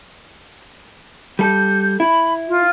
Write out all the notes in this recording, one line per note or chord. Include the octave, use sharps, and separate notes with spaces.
G3 A4 G6
E4 B5
F4